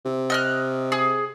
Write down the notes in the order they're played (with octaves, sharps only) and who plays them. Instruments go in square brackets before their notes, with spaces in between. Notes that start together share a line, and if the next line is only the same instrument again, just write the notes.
[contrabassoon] C3
[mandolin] D#5 F6 F#6
G#4